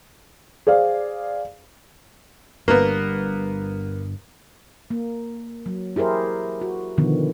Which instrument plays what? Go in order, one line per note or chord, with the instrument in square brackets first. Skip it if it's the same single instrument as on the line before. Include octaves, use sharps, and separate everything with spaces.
[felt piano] G#4 C5 D5 F5
[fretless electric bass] G1 G2 [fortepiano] A#3 B3
[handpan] A#3
F#3
E4 G4 G#4 A#4 C5
F#4
B2 D3 D#3 F3 B3